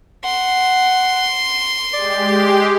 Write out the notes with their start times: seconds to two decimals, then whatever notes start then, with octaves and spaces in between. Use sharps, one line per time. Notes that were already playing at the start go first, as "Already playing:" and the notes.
0.24 F#5 C6
1.94 G#3 G4 D5